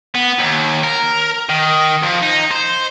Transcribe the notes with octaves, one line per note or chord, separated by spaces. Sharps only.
B3
D#2
A#4
D#3
F2
D#4
C5